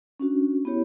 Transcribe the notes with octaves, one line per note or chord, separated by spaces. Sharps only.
C#4 D4 F#4
B3 E4 G4 C#5